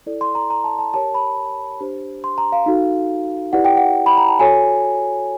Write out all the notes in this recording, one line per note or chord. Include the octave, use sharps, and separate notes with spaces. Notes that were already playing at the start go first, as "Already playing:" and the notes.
E4 A4 D5
C6
A#5
A#5
A5
A5
G4 A#4 C#5 A5
B5
D4 G4 C5
C6
A#5
F5
D#4 F#4 A4
E4 G4 B4 D5 F#5
G5
F#5
B5
A#5
A5
F#4 A4 C#5 G#5